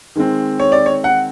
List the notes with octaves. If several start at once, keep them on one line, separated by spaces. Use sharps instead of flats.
D#3 G#3 C4
C#5
D5
C#5
F#5